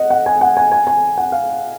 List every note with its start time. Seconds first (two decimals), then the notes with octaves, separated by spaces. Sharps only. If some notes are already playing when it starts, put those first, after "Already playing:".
Already playing: D#5 F#5
0.10 F#5
0.26 G#5
0.41 F#5
0.57 G#5
0.72 G#5
0.87 G#5
1.18 F#5
1.32 F5